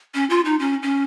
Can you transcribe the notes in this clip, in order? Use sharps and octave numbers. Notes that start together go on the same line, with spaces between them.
C#4
F4
D#4
C#4
C#4